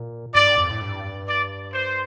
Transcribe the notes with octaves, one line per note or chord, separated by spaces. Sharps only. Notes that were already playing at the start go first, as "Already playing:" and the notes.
Already playing: A#2
G2 D5
F2
A2
G2
D5
C5